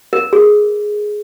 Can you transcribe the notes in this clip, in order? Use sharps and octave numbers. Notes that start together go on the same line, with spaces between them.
A#4
G#4